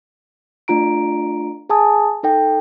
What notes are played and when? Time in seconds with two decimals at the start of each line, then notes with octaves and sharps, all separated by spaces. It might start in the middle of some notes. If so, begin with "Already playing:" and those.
0.68 A3 D4 F4 A#5 D7
1.69 G#4 G#5 A5 D#6
2.23 D#4 A4 G5